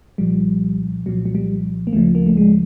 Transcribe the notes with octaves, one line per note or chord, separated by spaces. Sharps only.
C2 A#2 F3 G3
C2 A#2 F3 F#3
F#3
G3
A#3
D2 C#3 F3 A3
A#3
A3
G#3